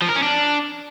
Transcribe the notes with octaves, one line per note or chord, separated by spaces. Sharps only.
F3
A#4
C#4
D4